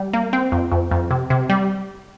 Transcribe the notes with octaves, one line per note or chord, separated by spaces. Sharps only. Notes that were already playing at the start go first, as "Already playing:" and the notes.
Already playing: G3
A#3
C4
F2
F2
F2
C3
C3
G3